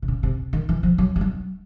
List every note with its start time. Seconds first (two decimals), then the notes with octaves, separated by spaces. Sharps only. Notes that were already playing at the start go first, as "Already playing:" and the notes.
0.02 C3
0.08 C#3
0.23 C3
0.53 D#3
0.69 E3
0.83 F3
0.98 F#3
1.16 G3
1.21 F#3